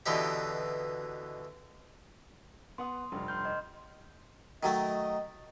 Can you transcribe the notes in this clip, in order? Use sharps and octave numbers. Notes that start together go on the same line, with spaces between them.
B2 D3 E3 D#4 G4
B3 F#5 C6 D#6
F1 G2
C6 F6 G6
D#5
D#3 F#3 A3 D#5